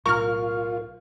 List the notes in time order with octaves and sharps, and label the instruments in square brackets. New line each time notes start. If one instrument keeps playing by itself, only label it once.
[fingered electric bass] B1 A2 [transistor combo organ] F4 [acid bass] A#4 [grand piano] C#6 F6